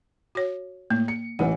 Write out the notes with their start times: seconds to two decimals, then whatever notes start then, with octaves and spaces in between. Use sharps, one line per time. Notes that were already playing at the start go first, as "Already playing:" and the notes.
0.35 F#4 C#5
0.90 A2 A#3
1.08 C#7
1.39 A1 E3 F#5